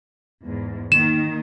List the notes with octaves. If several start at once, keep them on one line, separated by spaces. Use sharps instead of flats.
E2 G#2
D#3 A#3 D#4 E7